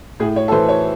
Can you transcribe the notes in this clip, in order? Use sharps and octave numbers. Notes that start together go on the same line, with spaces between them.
A2 G#4
C#5
A4
E3 C5
C#5